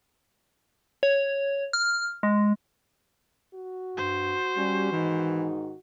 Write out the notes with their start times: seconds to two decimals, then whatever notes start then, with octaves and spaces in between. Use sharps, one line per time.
1.03 C#5
1.73 F6
2.23 G#3
3.54 F#4
3.97 G2 C5
4.56 G3 C#4
4.92 G#2 D#3 E3 D#4